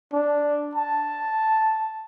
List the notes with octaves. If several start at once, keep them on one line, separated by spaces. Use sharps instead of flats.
D4
A5